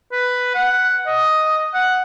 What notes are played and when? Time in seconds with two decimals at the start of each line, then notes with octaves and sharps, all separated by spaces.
0.12 B4
0.55 F#5
1.07 D#5
1.74 F#5